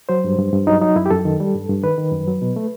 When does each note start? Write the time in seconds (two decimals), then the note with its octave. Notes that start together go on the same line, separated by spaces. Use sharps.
0.09 F#3 C5
0.24 G2
0.39 G2
0.53 G2
0.67 F#3 D#4
0.81 F#3 D#4
0.96 F#2 E4
1.06 G4
1.11 F#2 A4
1.25 D#3
1.40 G3
1.55 G2
1.69 G2
1.83 D#3 B4
1.98 D#3
2.12 F#2
2.27 F#3
2.42 B2
2.56 A3